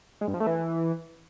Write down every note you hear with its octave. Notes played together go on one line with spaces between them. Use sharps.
G#3
G2
F3
A3
E3